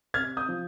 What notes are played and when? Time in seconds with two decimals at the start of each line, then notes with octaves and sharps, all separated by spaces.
0.14 C3 F6 G#6
0.37 D#6 G6
0.48 F3